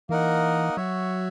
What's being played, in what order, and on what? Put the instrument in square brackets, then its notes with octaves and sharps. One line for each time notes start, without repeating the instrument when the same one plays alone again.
[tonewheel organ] E3 [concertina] A#3 D#4 A#4 D#5 F#5
[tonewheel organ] F#3 [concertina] F#4 C#5 E5